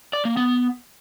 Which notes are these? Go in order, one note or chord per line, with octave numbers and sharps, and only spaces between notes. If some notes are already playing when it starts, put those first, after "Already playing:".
D5
A#3
B3